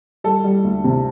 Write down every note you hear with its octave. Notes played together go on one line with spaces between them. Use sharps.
G3 A4
G3
D2
C3